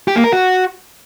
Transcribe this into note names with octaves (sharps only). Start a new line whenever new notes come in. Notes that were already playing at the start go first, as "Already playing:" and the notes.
G4
A#3
A#4
F#4